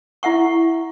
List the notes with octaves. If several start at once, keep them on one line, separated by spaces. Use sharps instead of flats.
E4 E5 F#5 C#6